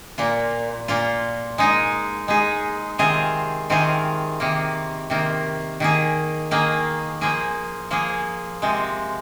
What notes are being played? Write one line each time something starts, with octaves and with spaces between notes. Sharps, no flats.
A#2 A#3 F4
A#2 A#3 F4
G#3 D#4 G#4
G#3 D#4 G#4
C3 D#3 C4 F4 G#4
C3 D#3 C4 F4 G#4
C3 D#3 A#3
C3 D#3 A#3
D#3 A#3 G#4
D#3 A#3 G#4
F3 A#3 G#4
F3 A#3 G#4
C3 F3 G#3